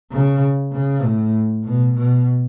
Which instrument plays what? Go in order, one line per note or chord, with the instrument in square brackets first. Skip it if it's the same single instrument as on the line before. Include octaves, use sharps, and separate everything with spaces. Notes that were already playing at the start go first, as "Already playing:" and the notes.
[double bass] C#3
C#3
A2
B2
B2